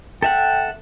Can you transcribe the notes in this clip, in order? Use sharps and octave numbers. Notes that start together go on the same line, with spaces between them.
A4 E5 F#5 G5